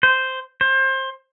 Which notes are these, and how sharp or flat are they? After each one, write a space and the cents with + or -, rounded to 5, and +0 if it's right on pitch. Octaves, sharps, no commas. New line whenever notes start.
C5 -5
C5 +25